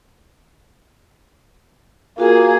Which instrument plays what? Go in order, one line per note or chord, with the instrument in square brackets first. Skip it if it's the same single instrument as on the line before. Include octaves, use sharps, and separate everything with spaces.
[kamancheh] A#3 G#4 [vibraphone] F4 F#4 A#4